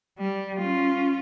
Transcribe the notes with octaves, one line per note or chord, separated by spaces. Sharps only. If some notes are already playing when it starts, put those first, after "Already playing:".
G3
C#4 F4